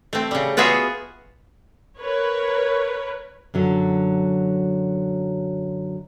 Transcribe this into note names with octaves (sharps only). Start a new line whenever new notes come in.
A3 C4
C#3 G3
B3 F4 F#4 G#4 E5
A#4 B4 C#5
F#2 D3 F#3